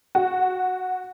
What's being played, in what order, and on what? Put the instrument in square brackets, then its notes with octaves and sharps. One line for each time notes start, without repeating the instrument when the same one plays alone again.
[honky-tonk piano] F#4